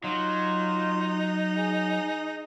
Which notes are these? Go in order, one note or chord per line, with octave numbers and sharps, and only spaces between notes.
F#3 D#4 F4
G#4